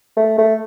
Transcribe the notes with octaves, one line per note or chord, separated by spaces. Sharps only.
A3
A3